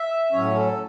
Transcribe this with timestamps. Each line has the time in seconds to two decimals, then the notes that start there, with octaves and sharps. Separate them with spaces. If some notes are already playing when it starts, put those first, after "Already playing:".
Already playing: E5
0.32 A2 F#3 C#4 C#5
0.55 A4